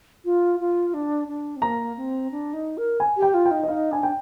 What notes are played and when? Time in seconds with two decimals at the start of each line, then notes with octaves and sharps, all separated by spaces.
0.25 F4
0.60 F4
0.94 D4
1.28 D4
1.56 C4
1.62 A#3 A#5
1.97 C4
2.32 D4
2.53 D#4
2.78 A#4
3.00 G#5
3.17 G4
3.22 G5
3.34 F4
3.46 G5
3.51 D#4
3.63 D#5
3.68 D#4 F5
3.91 D4 G#5
4.03 G5